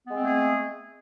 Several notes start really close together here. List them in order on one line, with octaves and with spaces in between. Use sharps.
B3 G#3 C4 A3 G#4